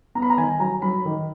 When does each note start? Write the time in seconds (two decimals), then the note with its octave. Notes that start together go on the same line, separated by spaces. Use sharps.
0.15 B3 A#5
0.22 B5
0.30 A#5
0.37 D#3 G#5
0.60 F#3 A#5
0.82 F#3 B5
1.05 D#3